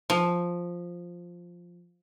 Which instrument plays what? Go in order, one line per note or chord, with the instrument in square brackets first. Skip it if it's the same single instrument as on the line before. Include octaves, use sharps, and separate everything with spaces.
[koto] F3